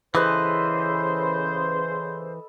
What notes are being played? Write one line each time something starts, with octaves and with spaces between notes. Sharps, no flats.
C#3 E3 A4 B4 C5 D#5